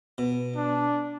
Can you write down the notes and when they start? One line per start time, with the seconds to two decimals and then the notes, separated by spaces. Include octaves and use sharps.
0.18 B2
0.56 D4